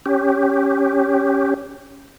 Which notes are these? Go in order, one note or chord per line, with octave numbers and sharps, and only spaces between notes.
C#4 G4